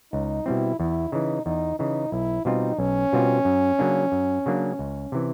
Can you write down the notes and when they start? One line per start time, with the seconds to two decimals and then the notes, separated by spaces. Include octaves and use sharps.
0.13 C#2 D#4
0.46 B2 G3 C4 E4
0.79 E2 E4
1.12 C#3 E3 D#4
1.45 E2 D#4
1.79 C#3 E3 D#4
2.12 B1 E4
2.45 B2 G3 C4 D#4 F4
2.78 B1 C#4
3.13 B2 G3 C4 F4
3.45 F#2
3.79 C#3 F#3 A#3 D4
4.12 F#2
4.46 C#3 F#3 A#3 D4
4.79 C#2
5.12 C3 E3